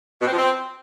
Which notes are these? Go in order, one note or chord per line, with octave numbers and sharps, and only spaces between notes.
B2
C4
F3
C4